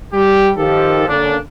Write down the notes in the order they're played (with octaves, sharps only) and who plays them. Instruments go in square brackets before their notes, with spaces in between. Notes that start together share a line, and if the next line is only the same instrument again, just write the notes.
[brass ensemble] G3 G4
D#3 F3 G4 A4
D3 A#3 C#4 D4